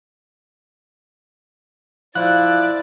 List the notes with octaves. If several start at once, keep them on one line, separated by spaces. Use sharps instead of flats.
F3 E4 D5 F#6 A6